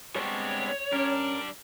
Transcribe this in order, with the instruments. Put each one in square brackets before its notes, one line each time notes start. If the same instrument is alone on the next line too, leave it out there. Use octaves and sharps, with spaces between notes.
[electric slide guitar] G3 B3 D4 [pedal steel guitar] G#3 C4 [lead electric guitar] C#5
[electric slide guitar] G3 D4 [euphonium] C#4 [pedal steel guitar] A#4